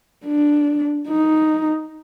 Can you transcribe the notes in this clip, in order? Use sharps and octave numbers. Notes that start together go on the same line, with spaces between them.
D4
D#4